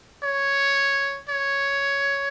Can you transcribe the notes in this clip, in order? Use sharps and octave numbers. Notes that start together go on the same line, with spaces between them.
C#5
C#5